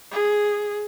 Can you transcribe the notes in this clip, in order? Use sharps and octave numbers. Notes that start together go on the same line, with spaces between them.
G#4